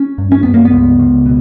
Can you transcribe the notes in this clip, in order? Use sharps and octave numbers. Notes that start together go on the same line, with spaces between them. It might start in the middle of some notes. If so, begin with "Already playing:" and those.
Already playing: C#4
G2
C#4
G2 B3
A#3
B3
C#2
C#2
B2